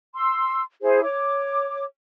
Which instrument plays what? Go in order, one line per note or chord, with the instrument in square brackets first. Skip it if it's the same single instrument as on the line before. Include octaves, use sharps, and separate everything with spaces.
[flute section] C6 E6
E4 G#4 C5
C#5 D6